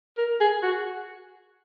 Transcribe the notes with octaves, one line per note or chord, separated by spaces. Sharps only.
A#4
G#4
F#4